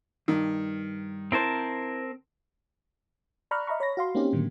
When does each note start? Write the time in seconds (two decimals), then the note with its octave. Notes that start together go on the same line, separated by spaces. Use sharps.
0.28 E2 G2 D#3
1.32 C4 E4 A#4 C5 A5
3.51 D5 A#5 B5 C#6 F6 F#6
3.67 D#5 E5 A#5 B5 C#6
3.80 C#5 B5 A#6
3.97 F#4 F5 C6
4.15 A#3 C4 C#4 D#4 G4
4.33 A2 D3 D#3 F#3 A#3